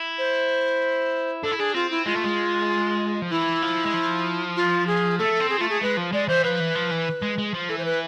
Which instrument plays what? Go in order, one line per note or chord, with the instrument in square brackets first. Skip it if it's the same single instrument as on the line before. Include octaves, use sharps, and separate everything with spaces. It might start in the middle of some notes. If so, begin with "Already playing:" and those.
Already playing: [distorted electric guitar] E4
[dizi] C5
[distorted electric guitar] D4 [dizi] A4
[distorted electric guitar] E4
[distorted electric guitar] D4 [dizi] G#4
[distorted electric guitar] C4 [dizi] F4
[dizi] E4
[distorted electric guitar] G#3 [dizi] F4
[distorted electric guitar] A3
G#3
F3
[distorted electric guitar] E3 [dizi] E4
[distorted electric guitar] F3
G#3
F3
[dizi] F4
G#4
[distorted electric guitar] A3 [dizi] A4
[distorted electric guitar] C4
[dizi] G#4
[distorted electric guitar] A3 [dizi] F4
[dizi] G#4
[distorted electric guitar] G#3 [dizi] B4
[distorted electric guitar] F3
[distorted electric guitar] G#3 [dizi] D5
[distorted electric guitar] E3 [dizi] C5
[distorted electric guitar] F3 [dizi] B4
[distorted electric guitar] E3
F3
E3
G#3
G#3
F3
[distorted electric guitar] E3 [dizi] A4
[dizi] C5
B4